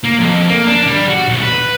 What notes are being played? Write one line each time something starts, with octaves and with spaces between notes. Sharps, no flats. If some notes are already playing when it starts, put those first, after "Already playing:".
A#3
F2
A#3
D4
G3
F#4
B1
B4